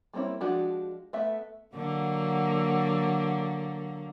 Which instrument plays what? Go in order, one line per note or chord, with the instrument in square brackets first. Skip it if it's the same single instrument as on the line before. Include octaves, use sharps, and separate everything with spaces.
[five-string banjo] G3 A#3 C4 C#4 E4
F3 G#3 D4 F#4 G4
A3 B3 E5
[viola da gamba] D3 F#3 A#3